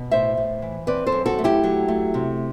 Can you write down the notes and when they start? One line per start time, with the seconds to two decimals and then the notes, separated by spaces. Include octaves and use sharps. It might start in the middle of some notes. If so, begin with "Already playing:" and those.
Already playing: B2
0.11 A2 C5 E5
0.37 A2
0.62 E3
0.87 C4 B4 D5
1.06 A4 C5
1.12 F#2
1.26 F#4 A4
1.39 A3
1.44 E4 G4
1.64 F#3
1.88 A3
2.14 C3